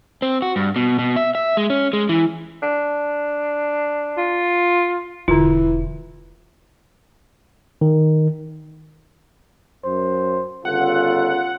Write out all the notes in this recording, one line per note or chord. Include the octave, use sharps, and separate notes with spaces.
C4
F#4
G2
B2
B2
E5
E5
G#3
C#4
G#3
E3
D4
F4
E1 D3 E3 F4
D#3
F#2 C5
G1 C#3 F4 A4 F#5